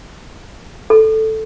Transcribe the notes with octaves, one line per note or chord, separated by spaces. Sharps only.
A4